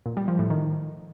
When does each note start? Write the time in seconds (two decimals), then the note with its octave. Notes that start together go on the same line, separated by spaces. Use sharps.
0.06 A#2
0.17 G3
0.28 F3
0.39 A2
0.50 D#3